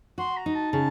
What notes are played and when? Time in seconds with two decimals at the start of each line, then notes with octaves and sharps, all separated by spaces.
0.18 F#4 C6
0.37 A#5
0.46 D#4
0.55 A5
0.72 C#3 A5